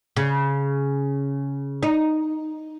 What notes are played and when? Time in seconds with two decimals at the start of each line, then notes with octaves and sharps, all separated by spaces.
0.16 C#3
1.83 D#4